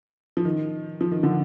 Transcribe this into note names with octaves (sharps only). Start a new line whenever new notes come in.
F3
D#3
F3
D#3
D3 F3